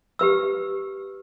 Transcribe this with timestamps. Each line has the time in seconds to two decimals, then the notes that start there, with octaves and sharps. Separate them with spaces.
0.19 G4 B4 E6